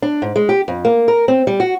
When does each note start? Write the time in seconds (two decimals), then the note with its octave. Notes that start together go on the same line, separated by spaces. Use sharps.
0.02 D4
0.22 G#2
0.36 G#3
0.49 G4
0.68 F2
0.85 A#3
1.08 A#4
1.28 C4
1.47 G3
1.60 F#4